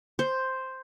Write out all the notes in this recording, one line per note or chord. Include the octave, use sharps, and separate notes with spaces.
C5